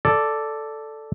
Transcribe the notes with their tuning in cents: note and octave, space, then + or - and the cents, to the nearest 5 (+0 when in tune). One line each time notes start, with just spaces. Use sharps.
A4 +0 D5 +0